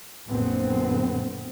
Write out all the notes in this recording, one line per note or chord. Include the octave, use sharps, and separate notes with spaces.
A#1 F#2 A#2 D3 B3 C4